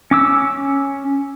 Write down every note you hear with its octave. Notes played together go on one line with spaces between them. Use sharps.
C#4 D6 E6